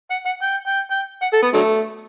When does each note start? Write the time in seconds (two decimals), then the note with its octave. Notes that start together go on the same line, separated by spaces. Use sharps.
0.11 F#5
0.26 F#5
0.42 G5
0.67 G5
0.91 G5
1.22 F#5
1.33 A4
1.43 B3
1.53 D3 F#3 A3